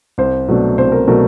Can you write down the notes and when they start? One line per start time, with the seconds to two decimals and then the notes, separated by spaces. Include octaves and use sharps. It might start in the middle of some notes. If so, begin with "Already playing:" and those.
0.18 C2 C5
0.48 B2 F#3 A3 D4
0.78 C2 C5
0.92 A#4
1.07 B2 F#3 A3 D4 A#4